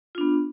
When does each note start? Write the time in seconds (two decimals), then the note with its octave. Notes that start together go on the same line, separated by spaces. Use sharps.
0.15 F4
0.18 D4
0.21 B3